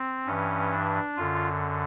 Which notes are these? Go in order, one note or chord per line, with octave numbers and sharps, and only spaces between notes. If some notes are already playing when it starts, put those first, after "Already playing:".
Already playing: C4
G2 E3 C#4
D4
F#2 D3 F4